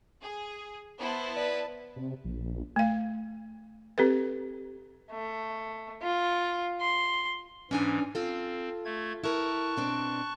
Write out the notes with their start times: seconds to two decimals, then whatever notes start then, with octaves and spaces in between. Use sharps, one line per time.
0.22 G#4
0.99 B3 E4 C5 A5
1.36 B4 D5
1.96 C3
2.24 A#1
2.76 A3 F5
3.98 C4 G4 A4 B4
5.11 A3
6.02 F4
6.81 C6
7.71 G#2 E3 C#4 D4 G#5
8.15 C4 F4 A4
8.85 A3 G#6
9.24 E4 A#4 B4 A5 C#6 F#6
9.77 B2 C4 D4